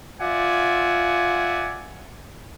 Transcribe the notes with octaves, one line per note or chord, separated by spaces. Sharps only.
F4 D5 E5 F#5 G#5